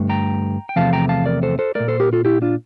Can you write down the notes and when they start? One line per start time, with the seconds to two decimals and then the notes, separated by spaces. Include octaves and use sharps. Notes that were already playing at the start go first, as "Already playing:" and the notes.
Already playing: G2 D3 A3
0.09 G5 A#5
0.69 G5
0.76 E2 C3 F3 A3 F5 A5
0.93 G5 A#5
1.09 F5 A5
1.26 A#4 D5
1.43 A4 C5
1.59 A4 C5
1.75 A#2 A3 A#4 D5
1.88 A4 C5
2.00 G4 A#4
2.13 F4 A4
2.25 E4 G4
2.42 D4 F4